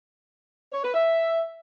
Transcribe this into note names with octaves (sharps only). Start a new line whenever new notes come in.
C#5
B4
E5